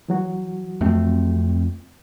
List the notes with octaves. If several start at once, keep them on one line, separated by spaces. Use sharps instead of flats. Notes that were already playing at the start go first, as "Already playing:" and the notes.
E3 F#3 F#4
F2 A3 C4